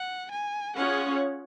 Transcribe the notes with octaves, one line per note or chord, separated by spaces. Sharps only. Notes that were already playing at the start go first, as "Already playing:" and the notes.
Already playing: F#5
G#5
C#4 F4 G#4 C#5 F#5